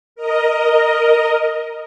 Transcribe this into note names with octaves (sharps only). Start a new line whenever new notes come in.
A#4 D#5